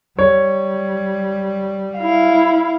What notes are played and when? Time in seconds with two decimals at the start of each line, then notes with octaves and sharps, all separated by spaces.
0.19 G3 C#5
1.98 E4 F5